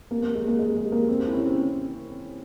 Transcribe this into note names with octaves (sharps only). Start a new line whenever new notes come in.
A#3
A#3
G#3
A#3
G#3
G#3
A#3
C4
C4
E4
C#4
C4